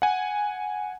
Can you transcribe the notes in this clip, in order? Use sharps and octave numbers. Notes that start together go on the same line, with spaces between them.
F#5 G#5